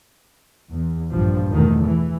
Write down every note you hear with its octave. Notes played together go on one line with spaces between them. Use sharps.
E2
A#1 G2 F3
E2 B2 D#3 A3
E3